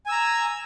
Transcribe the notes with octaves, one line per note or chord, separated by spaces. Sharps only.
G#5 A#5 E6